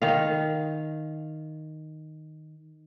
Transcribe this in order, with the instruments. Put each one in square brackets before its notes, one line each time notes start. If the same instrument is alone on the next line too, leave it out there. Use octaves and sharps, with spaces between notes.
[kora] D#3 F5